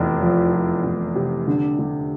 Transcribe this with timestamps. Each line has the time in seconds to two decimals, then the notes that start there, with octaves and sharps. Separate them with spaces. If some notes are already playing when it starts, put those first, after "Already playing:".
Already playing: F1 E2
0.22 F3
0.53 F3
0.84 F1
1.15 C3
1.47 D3
1.79 D3